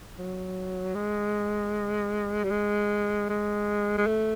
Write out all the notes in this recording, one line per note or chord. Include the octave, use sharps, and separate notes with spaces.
F#3
G#3
G3
G#3
G#3
G#3
A3